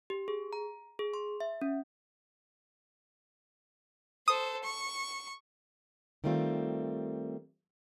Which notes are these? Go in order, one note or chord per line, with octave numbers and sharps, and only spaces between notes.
G4
G#4
A#5
G#4
C6
E5
C#4
A4 C5 D#6
C#6
D#3 G3 A3 C4 F4